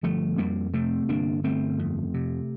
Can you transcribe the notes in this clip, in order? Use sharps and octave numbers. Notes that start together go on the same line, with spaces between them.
G1 F3 A3
F2 G3 A#3
C3 A3 C4
G1 A#3 D4
G1 A3 C4
F2
C3